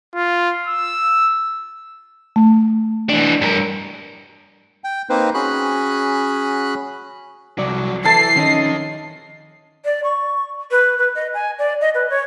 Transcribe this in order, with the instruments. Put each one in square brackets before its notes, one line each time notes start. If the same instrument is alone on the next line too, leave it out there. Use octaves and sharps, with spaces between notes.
[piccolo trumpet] F4
E6
[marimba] A3
[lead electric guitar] E3 D4
G2 A#4
[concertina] G5
A#3 C4 D#4 B4 C5
C#4 F#4 G#4 B5 F#6
[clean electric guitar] C2 D5 [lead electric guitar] F2 F#3
[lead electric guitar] E3 E4 [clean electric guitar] A4 [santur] A5 [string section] C7
[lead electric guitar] F2 D#5 [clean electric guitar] D#3 C#4
[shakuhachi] D5
C#6
B4
B4
D#5
G#5
D5
D#5
B4
C#5